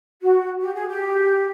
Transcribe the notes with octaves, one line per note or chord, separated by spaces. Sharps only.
F#4
G4
G#4
G4